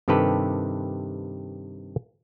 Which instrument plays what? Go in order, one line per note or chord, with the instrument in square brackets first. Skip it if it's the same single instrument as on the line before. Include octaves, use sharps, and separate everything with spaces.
[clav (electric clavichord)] G2 C3 D#3 G4 A4 B4